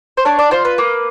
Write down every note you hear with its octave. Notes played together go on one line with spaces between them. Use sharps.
C5
D4 C#5
D5
F4 C5
B4
A#3